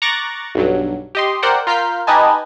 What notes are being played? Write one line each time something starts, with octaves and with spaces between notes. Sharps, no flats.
A#5 C#6 D6 F#6 A6 A#6
B1 G2 F#3
G4 D#5 C6
A#4 C5 D5 F#5 G5
F4 A#4 F6 G6 B6 C7
D#4 G4 B4 D#5 G#5 A5